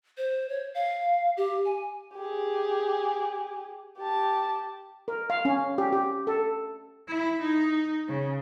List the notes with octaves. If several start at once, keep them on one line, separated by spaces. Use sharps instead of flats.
C5
C#5
F5
G4
G#5
G4 G#4
G4 A5
A#4
F5
C#4
G4
G4
A4
E4
D#4
C#3